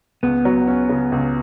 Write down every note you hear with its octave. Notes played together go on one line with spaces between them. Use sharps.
C#2 B3
F#3
C#4
C#3
C#2